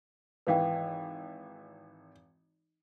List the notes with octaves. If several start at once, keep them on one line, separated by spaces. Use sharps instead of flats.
G#1 E3 B4 F5 G5